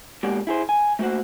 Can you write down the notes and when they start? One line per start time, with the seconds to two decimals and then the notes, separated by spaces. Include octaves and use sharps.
0.23 B2 G#3 A#3 G4 D5 F#5
0.47 E4 G#4 C5
0.69 G#5
0.99 A3 A#3 F#4 C5 F#5